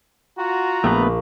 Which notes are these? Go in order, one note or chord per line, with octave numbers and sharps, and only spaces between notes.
F4 F#4 A#5
A#1 A3 B3 B4